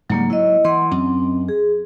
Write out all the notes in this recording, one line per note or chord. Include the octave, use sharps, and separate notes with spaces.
G#2 C#3 F#3 G3 A#3
F#3 E4 D#5
E3 F#5 C6
F#2 C4
G#4